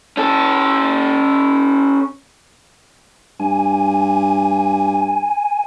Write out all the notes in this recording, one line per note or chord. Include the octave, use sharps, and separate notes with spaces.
C#4 A4
G2 G#5